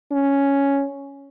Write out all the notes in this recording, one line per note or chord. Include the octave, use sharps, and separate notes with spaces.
C#4